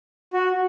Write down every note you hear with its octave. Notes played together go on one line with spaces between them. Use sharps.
F#4